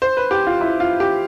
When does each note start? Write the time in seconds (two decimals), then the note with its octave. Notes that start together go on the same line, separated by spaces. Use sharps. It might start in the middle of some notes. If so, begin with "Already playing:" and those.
0.02 C5
0.17 B4
0.31 G4
0.47 F4
0.61 E4
0.80 F4
1.00 G4